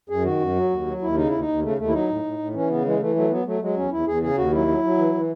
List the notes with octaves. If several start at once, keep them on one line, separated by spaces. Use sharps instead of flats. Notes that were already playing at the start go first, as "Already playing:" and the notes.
F#2 G#4
D#3 F#4
F#2
F#3
D#2
F#3
D#2 E4
C#3 D#4
D#2 E4
D#4
D#2
C#3 A3
D#2 A3
E4
F#3 D#4
A2
A2
A2
E3 C#4
C#3 B3
E3 G#3
E3 A3
F#3 A3
F#3 B3
F#3 A3
F#3 G#3
E2 C#4
E2 E4
E2 G#4
C#3 G#4
D#2 F#4
F#3 E4
F#3
F#3
E3
E3